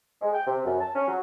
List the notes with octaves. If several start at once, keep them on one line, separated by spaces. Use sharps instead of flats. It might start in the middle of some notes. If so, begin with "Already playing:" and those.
G#3
G5
C3
F#2
A5
C#4
F#3